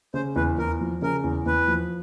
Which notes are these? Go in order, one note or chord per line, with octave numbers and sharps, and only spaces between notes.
C#3 C5
E2 B4
E2 A#4
F3
C#3 A#4
E2
E2 B4
F3